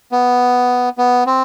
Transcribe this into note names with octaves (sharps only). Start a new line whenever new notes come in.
B3
B3
C4